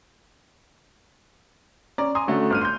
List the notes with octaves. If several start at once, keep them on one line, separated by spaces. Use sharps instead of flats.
C#4 D5 A#5
G#5 A#5 C6 D#6
D3 A3 C#4 F#4
G1 F6 D#7
C6 G6